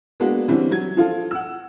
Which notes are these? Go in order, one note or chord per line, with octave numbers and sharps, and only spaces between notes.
G#3 A#3 B3 D4 F#4
D3 E3 G3 C4 C#4
F#3 G#6
F3 F4 A4
F#5 E6